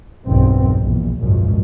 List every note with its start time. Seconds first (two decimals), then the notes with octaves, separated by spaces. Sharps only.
0.25 B1 E2 G2 D#3 C4
0.82 A#1 E2
1.20 G#1 C#2 F#2 A#2 F3